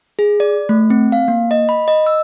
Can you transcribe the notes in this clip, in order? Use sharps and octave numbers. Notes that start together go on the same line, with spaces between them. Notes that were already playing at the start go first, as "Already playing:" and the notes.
G#4
D5
A3
C4
F5
A#3
D#5
B5
D#5
E6